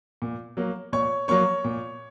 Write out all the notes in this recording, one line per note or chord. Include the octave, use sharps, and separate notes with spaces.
A#2
F#3 A#3
A#2 C#5 C#6
F#3 A#3 C#5 C#6
A#2